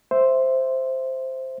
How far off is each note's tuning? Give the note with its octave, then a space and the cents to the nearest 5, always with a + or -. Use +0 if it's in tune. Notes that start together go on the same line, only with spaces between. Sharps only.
C5 +0 E5 +0